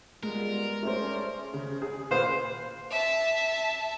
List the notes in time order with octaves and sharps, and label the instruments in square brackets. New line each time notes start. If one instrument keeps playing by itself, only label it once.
[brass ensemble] G3 B3 F4 [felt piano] G#3 [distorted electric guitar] A#4
[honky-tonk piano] A3 C#4 C5 [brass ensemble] G#4 D5
[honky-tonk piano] C#3
G#4
[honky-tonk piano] A#2 B4 F5 [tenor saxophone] C5
[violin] E5 A5